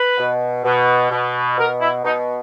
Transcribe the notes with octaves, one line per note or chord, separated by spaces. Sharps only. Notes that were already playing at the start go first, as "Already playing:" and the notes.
Already playing: B4
B2
B2
B2
B2 A#4
E4
B2 D#4